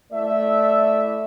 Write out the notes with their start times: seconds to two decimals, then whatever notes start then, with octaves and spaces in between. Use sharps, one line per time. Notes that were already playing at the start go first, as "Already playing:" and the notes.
0.12 A3 E4 D5 E5